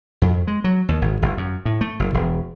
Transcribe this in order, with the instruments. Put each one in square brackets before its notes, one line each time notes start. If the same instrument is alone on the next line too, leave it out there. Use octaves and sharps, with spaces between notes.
[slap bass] F2
G#3
F#3
D#2
G#1
G1
F#2
A2
A3
F#1
E1